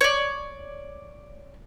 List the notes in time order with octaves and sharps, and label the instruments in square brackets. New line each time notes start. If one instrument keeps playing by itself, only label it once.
[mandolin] C#5 D5